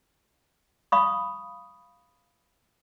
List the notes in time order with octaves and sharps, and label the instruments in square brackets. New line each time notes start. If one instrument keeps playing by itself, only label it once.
[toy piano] F5 B5 C#6 D#6